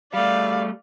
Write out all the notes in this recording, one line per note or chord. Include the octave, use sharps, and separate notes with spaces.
G3 A3 D5 F5